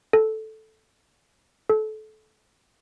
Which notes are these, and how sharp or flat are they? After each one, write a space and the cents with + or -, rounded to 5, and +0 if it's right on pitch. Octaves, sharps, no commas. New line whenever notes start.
A4 -5
A4 -25